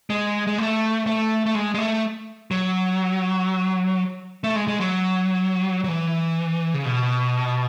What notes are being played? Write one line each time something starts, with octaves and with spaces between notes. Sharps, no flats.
G#3
G#3
A3
A3
A3
G#3
G#3
A3
F#3
A3
G#3
G#3
F#3
F#3
E3
C#3
B2